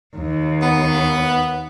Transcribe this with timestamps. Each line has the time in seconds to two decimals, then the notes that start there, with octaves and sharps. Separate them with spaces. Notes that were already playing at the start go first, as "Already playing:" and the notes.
0.16 D#2
0.62 B3